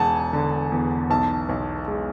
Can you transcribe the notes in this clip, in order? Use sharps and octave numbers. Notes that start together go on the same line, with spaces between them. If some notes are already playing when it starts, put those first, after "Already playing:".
Already playing: E1 G#3 F#5 G#5 A5
D3
E2
B1 A5
B1
G#3